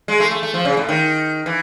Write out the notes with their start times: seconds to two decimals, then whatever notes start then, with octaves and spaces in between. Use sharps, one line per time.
0.08 G#3
0.20 A3
0.31 A3
0.43 A3
0.54 F3
0.65 C#3
0.77 A2
0.89 D#3
1.46 E3